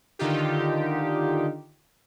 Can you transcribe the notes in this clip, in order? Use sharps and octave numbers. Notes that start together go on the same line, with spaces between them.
D3 D#3 D#4 F4 G4